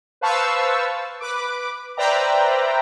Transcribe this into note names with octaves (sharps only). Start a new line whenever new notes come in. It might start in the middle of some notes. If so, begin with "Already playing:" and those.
B4 C5 F5 A5 C#6 E6
B4 D6
B4 C5 D5 E5 G5 A#5